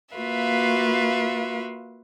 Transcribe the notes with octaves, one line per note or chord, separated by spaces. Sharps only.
A#3 F4 F#4 B4 E5 F5